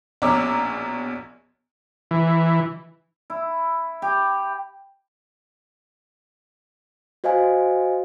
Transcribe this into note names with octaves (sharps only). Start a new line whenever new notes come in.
A#1 B2 C#4 A#5 D6 E6
E3
E4
G4
F#4 C5 D#5 F5 G#5